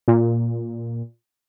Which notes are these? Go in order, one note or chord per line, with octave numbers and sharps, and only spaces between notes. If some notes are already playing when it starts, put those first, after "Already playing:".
A#2